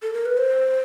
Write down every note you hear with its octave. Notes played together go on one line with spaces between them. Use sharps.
A4
A#4
B4
C5